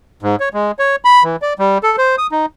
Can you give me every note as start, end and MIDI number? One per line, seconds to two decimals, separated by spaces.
0.22 0.36 44
0.40 0.49 73
0.54 0.71 56
0.79 0.96 73
1.05 1.23 83
1.24 1.36 52
1.42 1.53 74
1.59 1.78 55
1.83 1.96 69
1.98 2.16 72
2.18 2.27 87
2.32 2.46 63